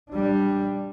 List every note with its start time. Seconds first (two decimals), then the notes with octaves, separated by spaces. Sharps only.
0.10 G3 D4